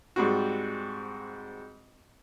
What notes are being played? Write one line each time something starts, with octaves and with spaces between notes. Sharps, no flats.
G#2 G3 C4 F#4